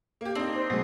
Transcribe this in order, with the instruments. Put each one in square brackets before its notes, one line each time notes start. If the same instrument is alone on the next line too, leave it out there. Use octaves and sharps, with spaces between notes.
[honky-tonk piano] A#3 G4
[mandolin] C4 [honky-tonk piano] D4 D#4
[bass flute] C5
[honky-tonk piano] B2 G#4 [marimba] F#3 G#3 A3